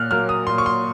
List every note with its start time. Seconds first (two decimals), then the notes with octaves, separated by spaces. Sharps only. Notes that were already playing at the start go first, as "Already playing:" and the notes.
Already playing: A#2 F6 F#6
0.11 F#3 A#3 F6
0.29 D#6
0.47 A#2 C6
0.58 C#6
0.66 C6